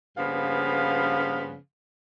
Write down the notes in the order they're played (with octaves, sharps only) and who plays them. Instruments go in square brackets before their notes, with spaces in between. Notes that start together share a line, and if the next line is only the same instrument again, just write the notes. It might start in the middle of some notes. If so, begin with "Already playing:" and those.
[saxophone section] G2 C#3 F3 A#3 B3 F5